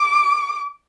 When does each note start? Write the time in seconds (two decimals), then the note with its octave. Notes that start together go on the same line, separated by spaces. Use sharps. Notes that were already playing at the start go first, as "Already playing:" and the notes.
Already playing: D6